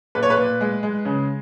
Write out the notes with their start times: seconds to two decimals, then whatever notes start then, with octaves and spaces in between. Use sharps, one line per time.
0.15 A#2 B4
0.23 C#5
0.30 B4
0.37 A#2
0.61 G#3
0.83 G#3
1.05 C#3